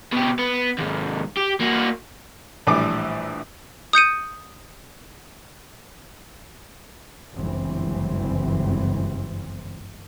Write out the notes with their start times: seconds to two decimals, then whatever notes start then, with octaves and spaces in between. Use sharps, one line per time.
0.13 B2 G4
0.39 B3
0.79 D#2 G#2
1.37 G4
1.60 A#3 F#4
2.67 A#1 A2 E3 G3 D5 D6
3.93 D#6 G6 C#7 D#7
7.34 G1 C#2 F#2 E3 C4